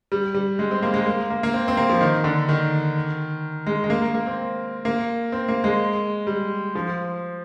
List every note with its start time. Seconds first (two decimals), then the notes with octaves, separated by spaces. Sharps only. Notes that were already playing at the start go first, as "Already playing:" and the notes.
0.12 G3
0.35 G3
0.59 G#3
0.71 C4
0.83 A#3
0.94 G#3
1.06 A#3
1.30 A#3
1.43 A#3
1.53 C4
1.68 C4
1.77 A#3
1.89 F3
2.01 D#3
2.24 D3
2.49 D#3
3.67 G#3
3.84 G#3
3.90 A#3
4.02 A#3
4.14 A#3
4.27 C4
4.85 A#3
5.32 C4
5.49 A#3
5.64 G#3
6.27 G3
6.75 F3